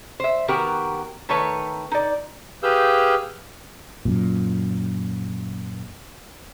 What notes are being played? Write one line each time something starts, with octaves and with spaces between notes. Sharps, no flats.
C5 E5
D#3 B3 F#4 G4 A#4
D#3 A3 B4 C#5 A#5
D#4 D5
G4 G#4 B4 F5 E6 G6
F#2 A#2